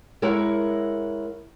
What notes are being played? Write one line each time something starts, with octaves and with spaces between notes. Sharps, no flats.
G#3 E4 A#4 C#5 F#5